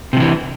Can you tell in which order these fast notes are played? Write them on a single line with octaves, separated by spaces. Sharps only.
C3 F3 E3